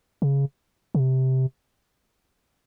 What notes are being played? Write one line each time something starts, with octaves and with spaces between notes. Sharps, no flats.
C#3
C#3
C3